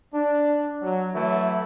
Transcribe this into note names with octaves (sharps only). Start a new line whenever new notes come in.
D4
F#3
E3 F#3 A3 E4